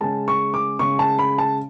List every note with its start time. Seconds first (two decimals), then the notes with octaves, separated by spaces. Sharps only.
0.01 C#3 G#3 C#4 A5
0.28 C#6
0.54 D6
0.79 C#3 G#3 C#4 C#6
0.99 A5
1.19 B5
1.38 A5